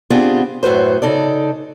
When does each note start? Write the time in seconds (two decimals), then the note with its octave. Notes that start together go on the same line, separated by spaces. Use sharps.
0.10 B3 C4 D4 F4 G4 G#4
0.63 F#2 A2 F#4 B4 C5
1.02 C#3 D#4 A4 D5